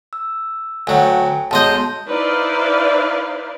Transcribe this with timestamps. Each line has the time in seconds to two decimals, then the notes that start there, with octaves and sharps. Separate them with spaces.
0.13 E6
0.87 D2 F#3 G5 G#5
1.51 B1 G#3 D#5 A5 C6 G6
2.07 D#4 E4 B4 C5 D5 F5